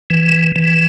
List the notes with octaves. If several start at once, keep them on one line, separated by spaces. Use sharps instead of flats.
E3
E3